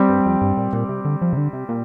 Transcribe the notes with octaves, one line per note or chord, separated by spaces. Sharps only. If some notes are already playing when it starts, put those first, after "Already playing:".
Already playing: G3 C4 G4 D5
G2
F2
G2
A#2
A#2
C3
D3
F3
C3
D3
C3
A#2